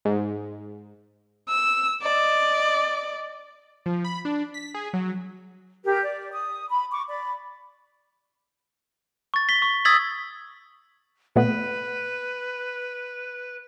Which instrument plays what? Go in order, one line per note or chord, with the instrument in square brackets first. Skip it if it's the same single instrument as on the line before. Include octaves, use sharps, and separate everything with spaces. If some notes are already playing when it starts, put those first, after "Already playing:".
[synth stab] G#2
[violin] E6
D5 D#5
[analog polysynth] F3
B5
D4
B6
G#4
F#3
[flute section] G4 A#4
D5
D#6
B5
C#6 D6
D5 B5
[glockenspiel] C#6 A6
B6 G7
C#6
D#6 E6 G#6 A6 B6 F#7
[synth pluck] A#2 A3 B3 [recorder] B4